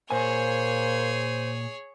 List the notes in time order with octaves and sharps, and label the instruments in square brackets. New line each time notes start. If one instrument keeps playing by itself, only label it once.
[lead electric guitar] A#2 G#5 [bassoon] A#3 [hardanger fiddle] G#4 C#5 [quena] C5